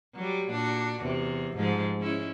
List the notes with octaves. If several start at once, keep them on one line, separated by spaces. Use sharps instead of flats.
F#3 G3
A#2 D4 F#4
E2 C3
G#2 F3 G#3
G#3 C#4 E4